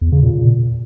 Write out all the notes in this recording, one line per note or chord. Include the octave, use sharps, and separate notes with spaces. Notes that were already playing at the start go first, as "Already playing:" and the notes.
E2
C#3
A#2